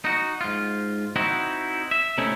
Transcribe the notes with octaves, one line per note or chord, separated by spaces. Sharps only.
D#4 F#4
G#2 F4
C4 D#4 E4 F#4
E5
C3 A3 C#4 D#4 E4